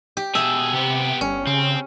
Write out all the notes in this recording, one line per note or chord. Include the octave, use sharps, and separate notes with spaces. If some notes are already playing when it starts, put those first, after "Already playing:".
G4
B2 G#4 E5
C3 B3 G4
G1 C#4
C#3 C4